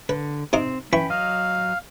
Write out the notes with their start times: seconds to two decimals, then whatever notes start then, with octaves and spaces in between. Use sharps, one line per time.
0.09 D3 B4
0.53 C3 C4 D#4 D6
0.93 E3 C#4 G5 B5 C#6
1.10 F#3 D#5 F5